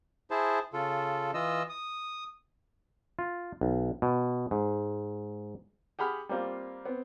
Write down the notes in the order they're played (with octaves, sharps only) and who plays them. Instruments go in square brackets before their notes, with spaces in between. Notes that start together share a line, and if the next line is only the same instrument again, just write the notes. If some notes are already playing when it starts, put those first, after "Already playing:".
[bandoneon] E4 G#4 C5 A5
C#3 F4 A4
E3 F4 D#5 E6
D#6
[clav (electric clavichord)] F4
B1
B2
G#2
[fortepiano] G4 G#4 F#5 B5 F6
G3 A#3 C4 F4
B3 C4